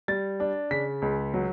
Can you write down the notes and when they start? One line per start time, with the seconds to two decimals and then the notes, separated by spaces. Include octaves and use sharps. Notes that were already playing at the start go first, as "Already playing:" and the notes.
0.08 G3 A6
0.40 D4
0.71 C#3 B6
1.02 C#2
1.34 F#3